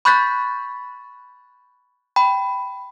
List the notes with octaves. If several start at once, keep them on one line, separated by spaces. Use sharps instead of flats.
B5 C#6 F#6 G6 A6 B6
G5 B5